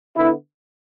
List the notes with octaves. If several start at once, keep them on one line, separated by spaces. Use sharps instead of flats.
D3 B3 E4